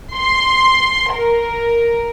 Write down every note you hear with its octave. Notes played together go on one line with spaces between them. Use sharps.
C6
A#4